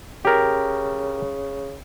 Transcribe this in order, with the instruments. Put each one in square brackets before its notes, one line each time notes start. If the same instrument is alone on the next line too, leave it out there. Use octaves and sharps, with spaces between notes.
[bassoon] C#3 [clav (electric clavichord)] G4 A#4